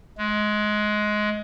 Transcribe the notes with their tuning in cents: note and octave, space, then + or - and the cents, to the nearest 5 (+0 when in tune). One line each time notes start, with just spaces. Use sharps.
G#3 +20